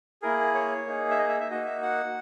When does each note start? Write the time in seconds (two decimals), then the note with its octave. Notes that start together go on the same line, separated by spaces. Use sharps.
0.22 A#3 E4 G#4 A#4
0.54 C#5
0.86 A#3 D#4 G#4
1.11 E5
1.18 D#5
1.29 E5
1.40 E5
1.51 A#3 D#4 F#4 D#5
1.66 E5
1.82 F#5